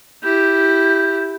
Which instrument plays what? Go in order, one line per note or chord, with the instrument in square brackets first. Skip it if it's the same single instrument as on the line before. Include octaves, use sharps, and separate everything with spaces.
[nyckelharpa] E4 G4 [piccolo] G6